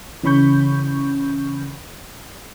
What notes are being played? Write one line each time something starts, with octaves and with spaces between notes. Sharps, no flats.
C#3 E3 C#4 B5 C#6 G6